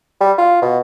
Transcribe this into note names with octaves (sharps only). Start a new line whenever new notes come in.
G3
F4
B2